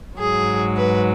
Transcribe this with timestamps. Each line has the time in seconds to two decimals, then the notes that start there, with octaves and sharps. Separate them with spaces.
0.18 G#2 F#3 G#4
0.76 B4